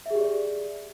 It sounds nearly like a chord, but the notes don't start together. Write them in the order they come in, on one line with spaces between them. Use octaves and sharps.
E5 G#4 G4 D5